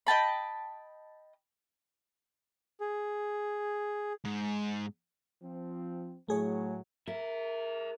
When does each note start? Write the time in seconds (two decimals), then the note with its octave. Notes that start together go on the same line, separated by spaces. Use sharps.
0.07 D#5 G5 A5 B5
2.81 G#4
4.25 G#2
5.42 F3 C4
6.28 A2 F#3 A3 G#4 C#5
7.07 G#4 A#4 E5